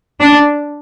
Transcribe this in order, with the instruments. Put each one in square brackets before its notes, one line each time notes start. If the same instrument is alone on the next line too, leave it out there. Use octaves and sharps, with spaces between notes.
[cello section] D4